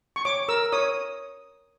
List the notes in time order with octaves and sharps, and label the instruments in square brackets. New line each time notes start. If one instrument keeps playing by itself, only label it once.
[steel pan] C#6
C#5 D6
A#4 E6
C#5 D#6